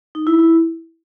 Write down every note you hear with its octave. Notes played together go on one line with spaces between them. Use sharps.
D#4
E4
E4